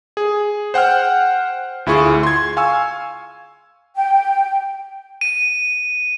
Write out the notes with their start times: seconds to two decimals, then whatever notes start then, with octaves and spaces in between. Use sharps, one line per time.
0.17 G#4
0.74 C5 F#5 G5 F6
1.86 D2 E4 F4 G#4 C#6
2.23 C6 G#6
2.57 F5 G#5 C#6 E6
3.95 G5
5.21 D#7